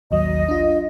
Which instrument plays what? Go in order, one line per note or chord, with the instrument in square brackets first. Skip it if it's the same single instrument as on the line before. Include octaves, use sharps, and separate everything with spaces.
[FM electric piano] A1 D#2 F#3 [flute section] D#5
[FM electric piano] D4 F4